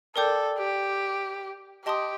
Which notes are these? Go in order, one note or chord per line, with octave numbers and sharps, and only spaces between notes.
A4 A#4 D5 G5 D6 G6
G4
G4 D#5 A5 C6 D#6